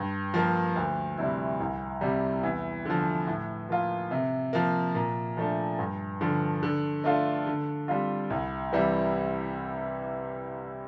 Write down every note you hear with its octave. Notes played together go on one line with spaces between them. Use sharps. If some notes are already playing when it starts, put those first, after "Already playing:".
Already playing: G2
F3 A#3
D2
C3 G3 C4 E4
C2
C3 G3
E2
D3 F3
A2
F3 A#3 F4
C3
F3 A#3
A#2
F3 A3 D4
G2
D3 F3
D3
A3 D4 F4
D3
G3 C4 F4
C2
C3 E3 G3